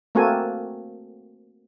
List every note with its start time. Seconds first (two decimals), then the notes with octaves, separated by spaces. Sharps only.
0.15 A3 A#3 C4 F#4 A4 G#5